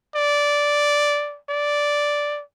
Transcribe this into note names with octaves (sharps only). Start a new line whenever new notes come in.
D5
D5